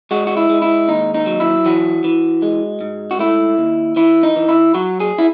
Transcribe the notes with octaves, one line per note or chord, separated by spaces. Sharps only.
G#3 F#4
F#4
E4
G#3
E4
D#2 D#4
D#4
F#3
E4
E3 F#4
E3
G#3
G#2
F#4
A3 E4
D#2
E3 E4
D#4
E3
E4
F#3 F#4
G#4
E4